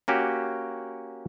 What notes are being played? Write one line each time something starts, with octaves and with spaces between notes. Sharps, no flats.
A#3 C#4 F#4 G4